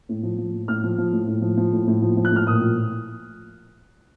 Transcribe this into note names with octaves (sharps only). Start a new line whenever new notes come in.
A2
F3
F3
A2
A2 F6
F3
F3
A2
A2
F3
F3
A2
A2
F3
F3
F#6
A2 F6
A#2 D#6
F3